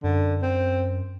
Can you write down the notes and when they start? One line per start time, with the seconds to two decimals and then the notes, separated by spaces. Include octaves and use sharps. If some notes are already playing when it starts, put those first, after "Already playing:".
0.03 F#2 D3
0.42 C4